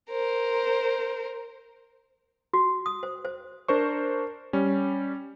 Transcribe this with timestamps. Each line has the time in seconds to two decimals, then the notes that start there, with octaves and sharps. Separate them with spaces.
0.11 A#4 C5
2.54 F#4
2.86 D#6
3.03 C5
3.25 C5
3.68 D4 A#4 C5 C#6
4.53 G3 C#4